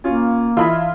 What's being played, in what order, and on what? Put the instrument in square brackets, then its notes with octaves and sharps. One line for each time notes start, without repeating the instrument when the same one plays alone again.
[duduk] A#3 [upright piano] C#4 F4
[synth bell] E3 E4 G#6 [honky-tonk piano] F4 [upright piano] E5 B5 E6